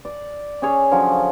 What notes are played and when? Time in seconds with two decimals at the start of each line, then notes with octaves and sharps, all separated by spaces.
0.05 D5
0.62 C#4 G#4 C#5
0.91 D3 F3 F#3 C#4